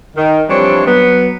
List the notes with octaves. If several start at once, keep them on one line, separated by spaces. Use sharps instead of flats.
D#3
E3 F3 G3 C4 D4 C#5
F#3 B3